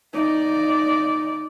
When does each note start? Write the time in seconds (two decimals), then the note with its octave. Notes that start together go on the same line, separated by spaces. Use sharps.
0.13 D#4 D5